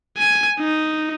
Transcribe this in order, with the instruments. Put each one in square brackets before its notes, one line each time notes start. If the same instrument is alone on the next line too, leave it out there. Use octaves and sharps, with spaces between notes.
[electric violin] G#5
D#4